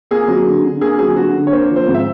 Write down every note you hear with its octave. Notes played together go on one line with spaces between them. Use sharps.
A#3 G#4
F#3
D3
D3
A#3 G#4
F#3 G#4
D3 F#4
D3
C#5
A#3 C5
F3
C5
G#2
E5